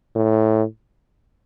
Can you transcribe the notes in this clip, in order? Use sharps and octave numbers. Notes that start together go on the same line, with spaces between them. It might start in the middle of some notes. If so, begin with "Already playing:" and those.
A2